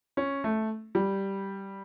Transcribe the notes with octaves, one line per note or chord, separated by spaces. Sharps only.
C#4
A3
G3